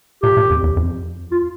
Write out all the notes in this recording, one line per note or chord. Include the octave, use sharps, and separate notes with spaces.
A#2 G4
A#2
F2
E2
F2
F4